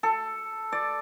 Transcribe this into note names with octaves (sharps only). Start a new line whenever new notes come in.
A4
D5